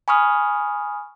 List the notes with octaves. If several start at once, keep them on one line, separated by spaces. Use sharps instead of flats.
G#5 B5 C#6 D#6 F6